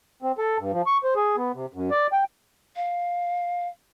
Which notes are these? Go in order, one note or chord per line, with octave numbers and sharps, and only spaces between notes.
C4
A4
G2
F3
C#6
C5
G#4
B3
C3
F#2
D5
G5
F5